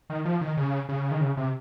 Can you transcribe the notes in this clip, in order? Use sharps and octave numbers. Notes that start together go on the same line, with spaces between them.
D#3
F3
D#3
C#3
C#3
D#3
C#3
C3